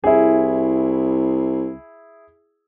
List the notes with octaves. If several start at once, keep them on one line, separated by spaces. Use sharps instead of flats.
C2 E4 G#4